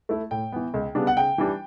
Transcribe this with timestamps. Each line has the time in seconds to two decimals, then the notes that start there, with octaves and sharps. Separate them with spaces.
0.09 A3 E4
0.31 A2 G5
0.52 E3 B3
0.74 C#2
0.95 C#3 G3 B3 D4
1.07 F#5
1.17 C#3 G5
1.38 E3 G3 D4